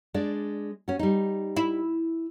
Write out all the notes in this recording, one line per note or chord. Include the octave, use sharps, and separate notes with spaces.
G#3 D4 D5
C#4 F#4
G3 D#4
E4